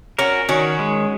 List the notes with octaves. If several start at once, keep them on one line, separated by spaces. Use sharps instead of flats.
C#4 F#4 A#4
D#3 C#4 F#4
G#3